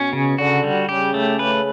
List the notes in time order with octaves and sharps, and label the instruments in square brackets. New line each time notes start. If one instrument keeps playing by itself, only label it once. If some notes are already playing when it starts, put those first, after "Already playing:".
Already playing: [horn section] B2 [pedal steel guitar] C#4
[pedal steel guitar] C#3
[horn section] D3 [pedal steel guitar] F#4
[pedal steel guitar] G3
[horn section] C#3 [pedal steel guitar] G4
[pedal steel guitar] A3
B4